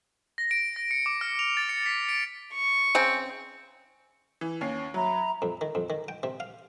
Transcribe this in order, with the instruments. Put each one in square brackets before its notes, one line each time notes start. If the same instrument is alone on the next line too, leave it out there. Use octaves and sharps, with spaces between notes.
[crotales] A#6
D7
A#6
C#7
D6
F6
F7
A6
C#7
B6
D7
[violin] C#6
[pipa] C#3 C4
[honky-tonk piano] E3
D#2 C#4 C7
[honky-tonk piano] F#3 [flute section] E5 A#5 B5
[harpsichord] F2
D#3
F2
D#3
G5
C3
F5